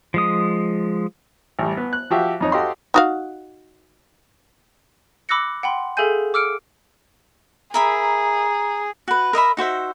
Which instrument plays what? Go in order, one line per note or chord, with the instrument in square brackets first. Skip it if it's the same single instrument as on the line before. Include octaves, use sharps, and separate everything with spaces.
[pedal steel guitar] F3 G#3 D#6
[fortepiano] A1 G3
B3
F#6
F3 F#4 G4 E5 F5
F2 D#4 C#5
F#4 G4 A4 D#5 F5 C6
[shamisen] D#4 F#4 F5
[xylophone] B5 D6 E6 F#6 A#6 C#7
F#5 G5 B5 C6
G#4 A4 E5 F5 G#5 G6
D6 E6 F6 C#7 D7
[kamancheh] G#4 [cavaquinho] A#4 E5 B5 [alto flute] A#5
[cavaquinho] F#4 B4
A#4 D#5 E5 B5
D#4 F#4 C5 E5